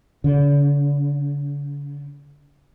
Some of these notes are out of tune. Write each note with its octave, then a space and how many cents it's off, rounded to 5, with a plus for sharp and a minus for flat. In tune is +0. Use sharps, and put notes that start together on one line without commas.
D3 -45